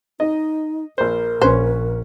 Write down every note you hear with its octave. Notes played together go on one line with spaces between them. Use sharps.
D#4 D#5
A#1 A#4 C5
A#1 C#4 B4 C5